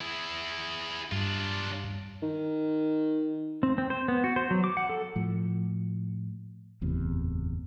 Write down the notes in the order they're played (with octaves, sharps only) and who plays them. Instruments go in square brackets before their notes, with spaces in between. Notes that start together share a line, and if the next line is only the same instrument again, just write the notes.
[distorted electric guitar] E4 G#4
[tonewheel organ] G2 [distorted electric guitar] D4 F4
[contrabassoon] D#3
[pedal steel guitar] C4
C4
C5
B3
F#4
C5
F#3
D6
F#5
A4
[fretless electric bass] A2 F3
F#1 E2 A2 C3